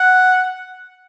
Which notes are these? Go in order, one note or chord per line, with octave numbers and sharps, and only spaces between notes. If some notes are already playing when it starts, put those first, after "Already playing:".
Already playing: F#5